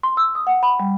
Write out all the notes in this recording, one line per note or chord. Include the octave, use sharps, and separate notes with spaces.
C6
E6
D#6
F#5
B5
G3